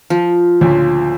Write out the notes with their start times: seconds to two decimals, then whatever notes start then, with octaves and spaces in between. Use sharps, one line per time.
0.10 F3
0.61 D2 A#2 C#3